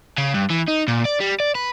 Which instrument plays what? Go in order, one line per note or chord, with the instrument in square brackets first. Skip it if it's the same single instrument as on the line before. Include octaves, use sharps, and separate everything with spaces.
[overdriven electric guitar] C#3
G2
E3
D#4
A#2
D5
G3
D5
B4